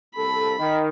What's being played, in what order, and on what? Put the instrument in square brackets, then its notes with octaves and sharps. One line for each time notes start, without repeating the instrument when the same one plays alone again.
[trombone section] C2 A4 [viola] B5
[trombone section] D#3